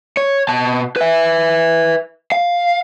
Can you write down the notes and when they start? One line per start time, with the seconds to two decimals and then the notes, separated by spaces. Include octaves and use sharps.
0.17 C#5
0.49 B2 A5
0.96 B4 E5
2.32 F5